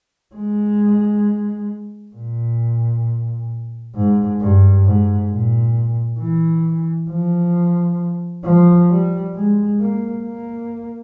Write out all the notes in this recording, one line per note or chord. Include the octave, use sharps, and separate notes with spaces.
G#3
A#2
G#2
G2
G#2
A#2
E3
F3
F3
G3
G#3
A#3
A#3